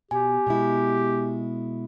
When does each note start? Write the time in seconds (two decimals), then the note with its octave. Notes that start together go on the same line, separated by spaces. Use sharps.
0.11 B2 G4 G#5
0.47 B2 G#3 E4